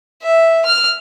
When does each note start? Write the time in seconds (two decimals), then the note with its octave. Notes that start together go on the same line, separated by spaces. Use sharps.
0.22 E5
0.65 F6